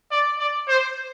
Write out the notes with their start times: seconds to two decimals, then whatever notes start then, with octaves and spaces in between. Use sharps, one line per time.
0.11 D5
0.39 D5
0.68 C5